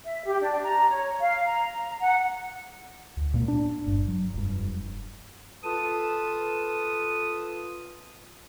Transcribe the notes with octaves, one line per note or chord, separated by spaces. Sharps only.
E5
G4
D4
A#5
C#5
F5
A#5
F#5
D2
A#2 A#3
D4
G1 G2
F#3
F1 G2
F4 A4 B4 A5 D#6